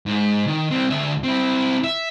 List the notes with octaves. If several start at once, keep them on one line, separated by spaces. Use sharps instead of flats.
G#2
D#3
G3 C4
D2 E5
C4 E4
E5